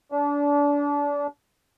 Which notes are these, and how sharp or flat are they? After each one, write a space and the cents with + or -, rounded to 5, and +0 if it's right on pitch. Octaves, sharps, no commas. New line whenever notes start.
D4 -30